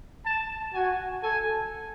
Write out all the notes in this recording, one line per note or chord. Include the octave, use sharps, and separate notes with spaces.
A5
F#4 G#5
A4 G#5